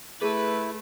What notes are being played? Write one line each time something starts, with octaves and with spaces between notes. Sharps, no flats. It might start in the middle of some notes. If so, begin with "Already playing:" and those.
A3 E4 G#4 B4 A5